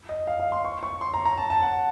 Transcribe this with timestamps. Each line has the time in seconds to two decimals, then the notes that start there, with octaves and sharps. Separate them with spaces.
0.09 D#5
0.27 F5
0.40 F5
0.52 C6
0.65 C#6
0.83 C#6
1.01 C6
1.14 A#5
1.25 A#5
1.37 A5
1.50 A5
1.62 F#5